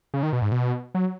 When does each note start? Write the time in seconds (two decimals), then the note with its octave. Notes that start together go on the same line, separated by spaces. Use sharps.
0.14 C#3
0.23 D#3
0.33 B2
0.42 G#2
0.52 B2
0.95 F#3